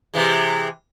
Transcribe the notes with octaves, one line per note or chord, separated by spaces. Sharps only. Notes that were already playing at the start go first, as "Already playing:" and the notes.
C3 E3 G#3